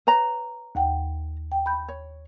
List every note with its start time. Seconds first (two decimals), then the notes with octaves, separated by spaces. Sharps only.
0.07 B4 C#5 A#5
0.75 D#2 F#5 G5
1.52 G5
1.66 B5 G6
1.88 C#5